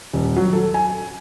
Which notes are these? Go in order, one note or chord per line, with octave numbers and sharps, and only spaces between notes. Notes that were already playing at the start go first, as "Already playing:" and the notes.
D#1
F#3
A4
G#5